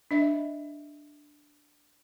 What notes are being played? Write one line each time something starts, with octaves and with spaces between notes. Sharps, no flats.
D4 D#5 E5